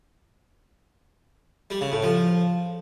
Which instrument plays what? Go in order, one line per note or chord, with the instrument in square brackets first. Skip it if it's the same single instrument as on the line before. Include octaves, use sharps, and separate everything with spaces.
[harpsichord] G3
C#3
A2
F3